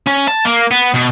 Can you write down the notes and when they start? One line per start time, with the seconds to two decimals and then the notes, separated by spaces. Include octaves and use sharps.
0.07 C#4
0.28 A5
0.45 A#3
0.71 B3
0.94 B2